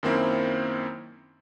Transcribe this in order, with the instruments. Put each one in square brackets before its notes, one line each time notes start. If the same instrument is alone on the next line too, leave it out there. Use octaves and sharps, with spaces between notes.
[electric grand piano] F#2 D#3 A#3 C4 E4